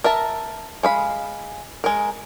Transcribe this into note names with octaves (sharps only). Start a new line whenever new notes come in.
A#4 E5 A5
G#3 F5 B5
G#3 A#4